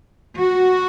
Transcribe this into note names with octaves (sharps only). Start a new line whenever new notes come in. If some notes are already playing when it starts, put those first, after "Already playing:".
F#4